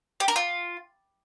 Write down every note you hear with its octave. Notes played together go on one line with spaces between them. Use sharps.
G4
A#4
F4